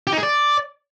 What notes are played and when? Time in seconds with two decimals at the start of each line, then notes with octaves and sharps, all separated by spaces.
0.07 G4
0.13 D#4
0.18 G#4
0.23 D5